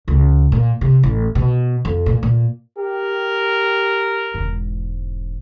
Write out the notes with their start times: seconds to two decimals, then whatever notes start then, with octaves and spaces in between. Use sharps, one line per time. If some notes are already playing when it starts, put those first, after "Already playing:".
0.08 C#2
0.52 A#2
0.81 C3
1.03 A1
1.35 B2
1.85 F2
2.06 A#2
2.23 A#2
2.78 G4 A#4
4.34 E1 G#2